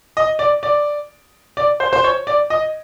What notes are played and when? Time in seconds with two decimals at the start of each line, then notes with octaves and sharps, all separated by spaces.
0.17 D#5
0.39 D5
0.63 D5
1.57 D5
1.80 C5
1.93 C5
2.04 C#5
2.27 D5
2.50 D#5